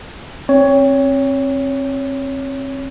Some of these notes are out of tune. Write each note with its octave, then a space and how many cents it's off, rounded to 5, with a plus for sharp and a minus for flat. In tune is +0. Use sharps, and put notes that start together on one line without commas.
C4 +30 C#5 +15